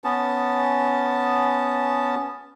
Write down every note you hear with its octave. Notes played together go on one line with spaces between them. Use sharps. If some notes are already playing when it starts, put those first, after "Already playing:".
B3 C#4 A5